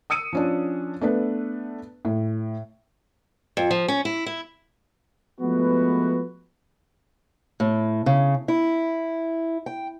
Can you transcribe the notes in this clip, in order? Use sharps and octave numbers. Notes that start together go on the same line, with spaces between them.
D#6 E6 C#7 D#7
F3 C#4 D4
A3 B3 D4 B4
A2
F2
F3
C#4
E4
E4
F3 G#3 A3 B3 F#4 B4
A2
C#3
E4
G5